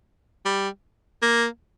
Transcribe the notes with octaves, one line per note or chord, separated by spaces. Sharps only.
G3
A#3